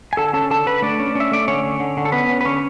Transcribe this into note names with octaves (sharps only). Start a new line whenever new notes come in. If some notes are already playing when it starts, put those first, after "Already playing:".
G#5
D3 A4 A5
C#4 A4 A5
D3 A4 A5
D3 B4 B5
A3 D4 D5
C#4
C#4 E5
A3 D5
D3 C#4 C#5
D3
D3
D3
A4
B3 C#4 B4
C#4
B4
D3 C#4 C#5